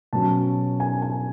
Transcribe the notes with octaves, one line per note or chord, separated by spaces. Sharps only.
B2 F#3 C#4 A5
G#5
G#5